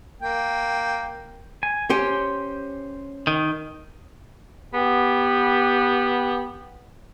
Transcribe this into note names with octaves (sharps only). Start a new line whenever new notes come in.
A#3 G5
G#5
C#4 G4 C5 C6
D#3
B3 G4